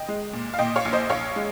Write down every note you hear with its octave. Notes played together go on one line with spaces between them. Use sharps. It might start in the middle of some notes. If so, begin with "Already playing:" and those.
Already playing: D#5 G5
G#3
A#2
F5
A#2 D#5 G5
C#5 F5
A#1
C5 D#5
A#1 C#5 F5
G#3